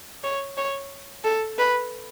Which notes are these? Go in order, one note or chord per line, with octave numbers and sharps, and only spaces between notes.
C#5
C#5
A4
B4